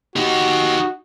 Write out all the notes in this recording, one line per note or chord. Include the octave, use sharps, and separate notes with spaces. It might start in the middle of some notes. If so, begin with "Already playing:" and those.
D#4 F#4 G4